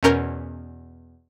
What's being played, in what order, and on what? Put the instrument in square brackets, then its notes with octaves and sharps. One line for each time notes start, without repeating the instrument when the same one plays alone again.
[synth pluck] E2 B2 C#4 A#4 G6